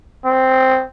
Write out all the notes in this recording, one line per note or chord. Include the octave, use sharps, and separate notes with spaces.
C4